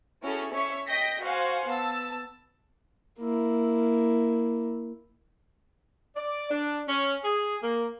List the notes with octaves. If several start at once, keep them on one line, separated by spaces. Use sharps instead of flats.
C#4 E4 F#4 G#4 A4
C#4 C#5 E5 C#6
D#5 G5 G6 A#6 B6
F#4 C5 F5 F#5 G#5
B3 A5 E6
A#3 E4
D5
D4
C#4
G#4
A#3